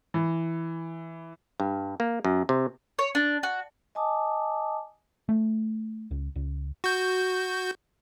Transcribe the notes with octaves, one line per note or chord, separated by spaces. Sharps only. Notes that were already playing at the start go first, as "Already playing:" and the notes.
E3
G2
A#3
F#2
C3
C#5
D4
F#4
D#5 G#5 A5 D6 D#6
A3
C#2
C#2
F#4 G6